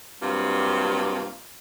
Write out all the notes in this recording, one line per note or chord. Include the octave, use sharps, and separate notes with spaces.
G2 C3 F#3 A#3 F4